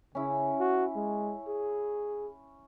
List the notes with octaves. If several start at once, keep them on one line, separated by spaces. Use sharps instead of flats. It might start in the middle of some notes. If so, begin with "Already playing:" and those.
C#3 C#4 E4
F#4
G#3
G#4